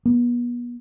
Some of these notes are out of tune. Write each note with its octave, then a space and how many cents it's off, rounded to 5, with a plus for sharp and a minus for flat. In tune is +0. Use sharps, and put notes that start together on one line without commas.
B3 -35